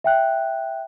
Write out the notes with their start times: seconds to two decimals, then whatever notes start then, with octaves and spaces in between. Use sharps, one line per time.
0.04 E5 G5 F#6